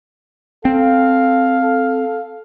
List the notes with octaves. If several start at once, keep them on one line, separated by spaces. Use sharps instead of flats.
C4 A4 F5